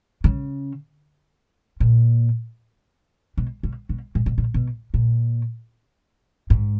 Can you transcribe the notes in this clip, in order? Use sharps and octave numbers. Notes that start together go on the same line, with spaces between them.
C#3
A#2
B2
B2
B2
A#2
B2
A#2
B2
A#2
G#2